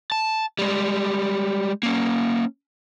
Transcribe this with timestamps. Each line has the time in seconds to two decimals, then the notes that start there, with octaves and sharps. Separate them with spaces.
0.12 A5
0.59 G3 G#3
1.83 A#3 C#4